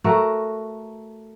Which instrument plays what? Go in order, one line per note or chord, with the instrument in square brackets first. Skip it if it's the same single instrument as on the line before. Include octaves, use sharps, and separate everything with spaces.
[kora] A3 F#4 A#4